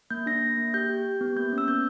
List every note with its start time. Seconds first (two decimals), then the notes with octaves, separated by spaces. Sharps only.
0.11 A#3 G6
0.26 D4 A#6
0.42 A#3
0.57 A#3
0.74 G4 G6
0.89 G4
1.05 G4
1.21 B3
1.36 A#3 G6
1.52 C#4
1.58 E6
1.68 B3 G6